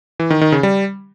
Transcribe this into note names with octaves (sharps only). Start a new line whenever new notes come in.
E3
D#3
D#3
C#3
G3